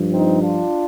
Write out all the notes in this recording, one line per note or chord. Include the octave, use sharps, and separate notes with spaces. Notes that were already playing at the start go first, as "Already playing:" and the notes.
Already playing: G2 F3
C4 D#4
D4 F4